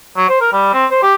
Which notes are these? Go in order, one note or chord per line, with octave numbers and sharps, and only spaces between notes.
F#3
C5
A#4
G3
C4
C5
G4